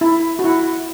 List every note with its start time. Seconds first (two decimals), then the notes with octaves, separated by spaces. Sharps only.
0.01 E4
0.39 F#4
0.44 E4